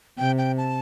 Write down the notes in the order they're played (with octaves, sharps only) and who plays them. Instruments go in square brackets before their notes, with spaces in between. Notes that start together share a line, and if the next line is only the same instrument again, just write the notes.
[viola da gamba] C3 [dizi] G5
[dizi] G5
A5